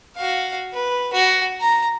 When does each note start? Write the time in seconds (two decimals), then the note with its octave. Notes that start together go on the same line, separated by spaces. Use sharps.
0.16 F#4 F5
0.74 B4
1.13 F#4
1.61 A#5